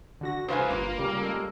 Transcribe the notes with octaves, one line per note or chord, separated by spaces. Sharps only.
D3 F#4 A#6
C2 B4 C5 F5 G#5
G1 A#3 F4
C#3 G3 A#4
G#3 A4 A#4